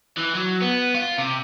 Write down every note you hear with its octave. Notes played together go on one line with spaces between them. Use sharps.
E3
F#3
B3
F4
C3